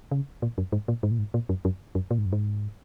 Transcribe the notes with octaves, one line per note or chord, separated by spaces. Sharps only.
C#3
A#2
F#2
G#2
A#2
G#2
A#2
G#2
A#2
F#2
F#2
F#2
A#2
G#2
F#2
G#2